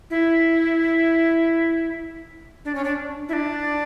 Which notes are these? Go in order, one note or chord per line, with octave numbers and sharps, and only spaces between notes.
E4
D4
C#4
D4
E4
D4